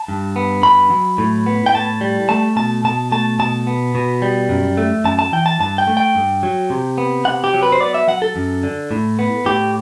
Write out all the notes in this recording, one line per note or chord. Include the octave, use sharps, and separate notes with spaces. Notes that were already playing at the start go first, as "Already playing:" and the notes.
Already playing: A5
G2
B3
G2 B5
F#3
A2
B3
G5
A2 A5
G3
A3 A5
B2 A5
B2 A5
A3 A5
B2 A5
B3
B2
G3
F#2
A3
F#2 A5
A5
E3 G5
A5
G2 A5
G5
A3
G5
G2
F#3
C3
B3
C3 F#5
G4
F#3
B4
C5
B3 D5
E5
F#3 F#5
A4
F#2
D3
A2
B3
A2 G4